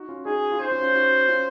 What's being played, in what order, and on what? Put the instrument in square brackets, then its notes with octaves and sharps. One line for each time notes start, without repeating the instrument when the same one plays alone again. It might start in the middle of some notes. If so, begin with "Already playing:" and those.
Already playing: [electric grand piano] D#4 F#4
C#4 F4
[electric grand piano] D#4 F#4 [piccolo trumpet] G#4
[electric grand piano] F4
[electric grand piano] D#4 F#4 [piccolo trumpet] C5
[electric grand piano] C#4 F4
C#4 F4
D#4 F#4
C#4 F4